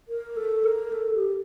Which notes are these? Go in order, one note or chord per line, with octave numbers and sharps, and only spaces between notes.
A#4
A4
A#4
A4
G4